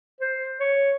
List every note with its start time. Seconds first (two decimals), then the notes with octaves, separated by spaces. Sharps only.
0.21 C5
0.60 C#5